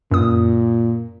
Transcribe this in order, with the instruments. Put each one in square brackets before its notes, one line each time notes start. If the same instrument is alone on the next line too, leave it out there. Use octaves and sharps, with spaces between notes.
[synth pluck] F#2 D#6 [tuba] A#2